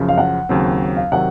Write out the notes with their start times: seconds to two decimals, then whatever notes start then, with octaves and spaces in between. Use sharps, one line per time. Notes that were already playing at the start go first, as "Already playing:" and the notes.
Already playing: F#2 C#3 F3
0.08 F5
0.18 F#5
0.49 D#2 C#3 F#3 C4
0.96 F5
1.12 C3 D#3 F#3 F#5